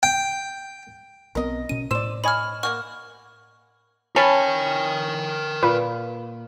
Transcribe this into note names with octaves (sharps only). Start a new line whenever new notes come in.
G5
B1 B3 C4 A#4 D#5
B2 C#4 D#7
A2 C5 D5 E6 E7
C#5 D#5 G#5 B5 F6
A#3 C4 F#5 C#6 F6
C#4 A#4 G5 A5 B5
A#2 B4